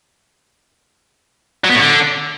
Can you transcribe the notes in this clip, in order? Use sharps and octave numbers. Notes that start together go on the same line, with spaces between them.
F#3
B3
A2
D3